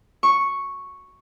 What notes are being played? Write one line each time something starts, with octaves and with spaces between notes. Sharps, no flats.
C#6